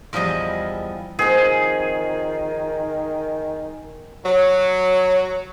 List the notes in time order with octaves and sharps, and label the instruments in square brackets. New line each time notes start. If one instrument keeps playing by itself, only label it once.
[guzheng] E2 F3 G3 G#4 D#5
[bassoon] D#3 [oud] F3 C4 [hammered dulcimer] G#4
[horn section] F#3